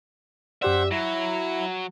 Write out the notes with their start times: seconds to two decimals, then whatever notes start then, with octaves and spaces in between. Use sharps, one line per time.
0.62 F#2 G4 C5 D5 E5 F#5
0.91 F#3 E4 A#6